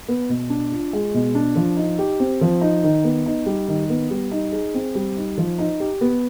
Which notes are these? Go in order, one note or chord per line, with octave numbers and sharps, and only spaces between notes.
B3
B2
D4
F4
G#3
B2
D4
F3
D#4
G4
C4
F3
D#4
D#3
B3
D#4
G3
D#3
B3
G3
D#4
G#4
C4
G3
D#4
F3
D#4
G4
B3